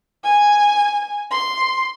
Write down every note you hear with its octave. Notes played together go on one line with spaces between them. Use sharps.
G#5
C6